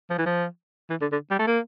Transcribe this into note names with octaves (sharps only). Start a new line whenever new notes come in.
F3
E3
F3
E3
D3
D3
G3
A3
A#3